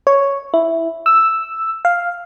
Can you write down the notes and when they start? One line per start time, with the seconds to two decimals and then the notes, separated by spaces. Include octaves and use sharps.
0.07 C#5
0.54 E4
1.06 E6
1.85 F5